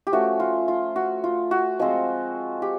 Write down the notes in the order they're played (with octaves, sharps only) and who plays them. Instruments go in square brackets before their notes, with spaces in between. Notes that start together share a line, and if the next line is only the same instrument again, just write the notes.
[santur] G4
F3 A3 C#4 F#4
F4
F4
F#4
F4
F#4
F3 G#3 C4 F4
G4